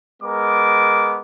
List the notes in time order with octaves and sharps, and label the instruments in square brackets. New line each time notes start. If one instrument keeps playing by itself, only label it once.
[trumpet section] G#3 B3 A#4 D6